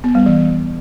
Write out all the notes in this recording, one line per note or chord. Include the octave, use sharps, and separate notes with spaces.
B3
G3
E3